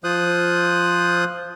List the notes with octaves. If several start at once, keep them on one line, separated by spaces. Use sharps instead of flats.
F3 F4 C5 D#6 F#6